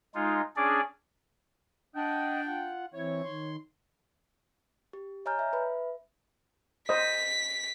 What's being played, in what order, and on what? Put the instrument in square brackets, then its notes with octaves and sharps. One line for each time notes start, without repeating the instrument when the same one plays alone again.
[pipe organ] G#3 D#4 F4
C#4 D4 G#4 D5
[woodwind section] D4 G5 [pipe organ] D#5 F#5
[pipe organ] F4 F#5
[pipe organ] E3 C4 E4 [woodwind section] C#5
[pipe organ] D#3 C6
[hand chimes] G4
C#5 D#5 G#5 A#5 F6 G6
E5
B4 E5 B5
[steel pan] C5 D#5 [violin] B6